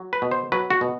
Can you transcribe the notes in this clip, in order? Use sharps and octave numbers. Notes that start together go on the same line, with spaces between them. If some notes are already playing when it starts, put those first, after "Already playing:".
Already playing: F#3
B4
B2
C5
F#3 B4
F#4
B2